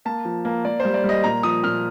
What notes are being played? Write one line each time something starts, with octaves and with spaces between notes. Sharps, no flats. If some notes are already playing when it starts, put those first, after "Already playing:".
A#3 A5
F3
A#3
A#3 D5
G3 C5
D5
G3
D#5
A#2 A#5
F3 D#6
A#2 F6